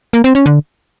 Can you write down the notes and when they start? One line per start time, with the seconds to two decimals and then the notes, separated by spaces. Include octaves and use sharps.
0.13 A#3
0.24 C4
0.35 C#4
0.46 D3